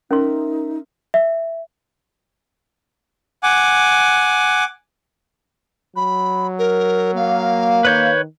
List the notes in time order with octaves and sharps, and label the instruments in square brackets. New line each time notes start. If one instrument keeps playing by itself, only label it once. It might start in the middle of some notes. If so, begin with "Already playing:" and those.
[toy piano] C#4 C6 [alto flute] D#4 [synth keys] A#4 E5
[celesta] E5
[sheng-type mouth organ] F#5 G#5 D6
[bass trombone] F#3 [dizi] B5
[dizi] A#4
[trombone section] A#3 [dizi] F5
[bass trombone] D#3 [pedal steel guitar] B4 C#5 G6